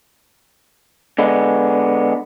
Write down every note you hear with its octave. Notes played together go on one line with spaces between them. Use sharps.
D3 G#3 B3